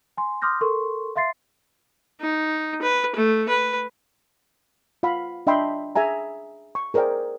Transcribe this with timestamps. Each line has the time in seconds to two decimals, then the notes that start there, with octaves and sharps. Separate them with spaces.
0.17 G#5 C6
0.42 C6 D6 D#6 F6 G6 A#6
0.61 A4 A#4 C6 C#6
1.16 E5 F5 C6 A6 C7
2.21 D#4
2.82 B4
3.16 A3
3.49 B4
5.03 F4 F5 F#5 B5
5.47 D4 D#5 E5 G5 B5 C6
5.95 G#4 E5 G#5 A#5
6.75 C#6
6.94 G#4 A#4 C5 D5 G5